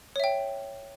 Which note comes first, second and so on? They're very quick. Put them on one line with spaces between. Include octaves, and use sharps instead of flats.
C#5 E5 G5